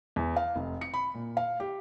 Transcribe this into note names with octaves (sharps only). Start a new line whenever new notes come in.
E2
F5
F1
C#7
B5
A#2
F5
G4